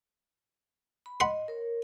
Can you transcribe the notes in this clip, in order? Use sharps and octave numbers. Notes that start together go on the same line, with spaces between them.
B5
D#5 F#5 B5 C6
A#4 C#5